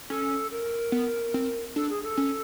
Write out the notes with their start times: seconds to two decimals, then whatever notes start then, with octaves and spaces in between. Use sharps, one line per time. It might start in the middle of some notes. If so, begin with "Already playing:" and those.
0.10 C#4 A4
0.51 A#4
0.92 B3
1.34 C4
1.76 D4 A4
1.89 G#4
2.03 A4
2.17 C#4